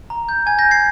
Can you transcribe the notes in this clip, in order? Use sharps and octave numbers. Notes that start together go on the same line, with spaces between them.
A#5
G6
G#5 G#6
G6 A#6
G#5
G#6 C7